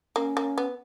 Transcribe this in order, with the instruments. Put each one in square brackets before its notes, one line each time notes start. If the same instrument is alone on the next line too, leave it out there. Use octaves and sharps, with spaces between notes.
[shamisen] A#3 [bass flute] C#4
[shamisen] A#3
B3